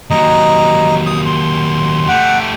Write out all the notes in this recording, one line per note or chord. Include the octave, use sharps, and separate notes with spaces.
D#2 F#3 D#5 A#5
D#6
C6
A3 G4 F#5